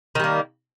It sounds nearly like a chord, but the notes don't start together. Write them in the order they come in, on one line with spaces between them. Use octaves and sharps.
D#3 G3 A#3